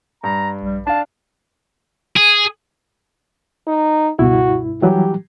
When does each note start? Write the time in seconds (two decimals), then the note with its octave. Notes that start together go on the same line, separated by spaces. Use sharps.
0.24 G2 A#5
0.62 A#1 G3
0.87 D4 F5 A5
2.16 G#4
3.67 D#4
4.19 C#2 G2 B2 E4 F#4
4.82 E3 F#3 G3 G4